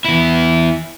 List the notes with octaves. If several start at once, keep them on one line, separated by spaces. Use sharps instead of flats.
E2 E4